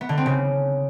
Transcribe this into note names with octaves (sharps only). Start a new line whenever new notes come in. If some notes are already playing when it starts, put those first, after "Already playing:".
B3
D3
C4
C#3